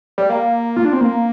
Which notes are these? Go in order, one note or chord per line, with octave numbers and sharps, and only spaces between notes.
G3
A#3
F4
D4
C4
A#3